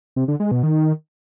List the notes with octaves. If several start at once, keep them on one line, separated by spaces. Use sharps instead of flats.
C3
D3
G#3
B2
D#3